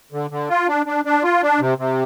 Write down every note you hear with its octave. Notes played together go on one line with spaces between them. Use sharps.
D3
D3
F4
D4
D4
D4
F4
D4
C3
C3